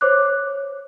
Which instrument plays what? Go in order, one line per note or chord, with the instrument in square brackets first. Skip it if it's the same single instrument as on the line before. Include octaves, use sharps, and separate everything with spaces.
[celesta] C5 C#5 D6 F#6